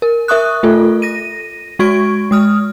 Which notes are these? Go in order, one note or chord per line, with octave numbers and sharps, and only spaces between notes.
A#4
A#4 E5 C#6 D#6 F#6
A3 F4 A4
A#6 D#7
G#3 F#4 C#6 G#6 D7
G#3 D#6 F6